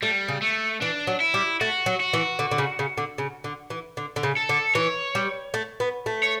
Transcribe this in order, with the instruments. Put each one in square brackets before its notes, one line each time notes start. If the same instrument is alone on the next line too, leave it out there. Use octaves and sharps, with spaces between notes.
[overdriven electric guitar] G3 [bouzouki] A3
[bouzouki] C#3
[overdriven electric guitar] A3
[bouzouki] E3 [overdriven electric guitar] D4
[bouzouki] F#3
[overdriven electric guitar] E4
[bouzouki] G3
[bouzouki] A3 [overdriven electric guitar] F#4
[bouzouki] F#3
[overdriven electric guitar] F#4
[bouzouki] E3
D3
D3
C#3
C#3
D3
C#3
D3
E3
D3
D3
C#3
[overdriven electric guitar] A4
[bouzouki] D3
[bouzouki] E3 [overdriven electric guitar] C#5
[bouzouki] G3
A3
B3
A3
[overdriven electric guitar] C#5